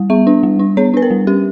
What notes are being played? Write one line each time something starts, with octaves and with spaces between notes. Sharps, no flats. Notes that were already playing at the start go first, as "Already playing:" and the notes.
Already playing: G3
B3 E5
D4
G3
D4
B3 C#5
D4 B4
A#4
G3
C#4 G4